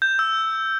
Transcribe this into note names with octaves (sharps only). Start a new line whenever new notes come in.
G6
E6